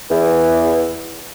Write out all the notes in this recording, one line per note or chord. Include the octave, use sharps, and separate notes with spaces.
E2 E3